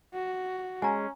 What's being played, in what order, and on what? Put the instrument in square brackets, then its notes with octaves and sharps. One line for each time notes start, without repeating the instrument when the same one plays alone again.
[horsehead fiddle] F#4
[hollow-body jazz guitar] G#3 [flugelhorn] C#4 [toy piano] G#5 A#5